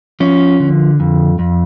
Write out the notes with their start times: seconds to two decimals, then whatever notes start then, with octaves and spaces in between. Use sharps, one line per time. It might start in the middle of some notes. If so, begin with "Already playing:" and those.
0.20 F3 C#4
0.60 D3
1.00 F2
1.39 F2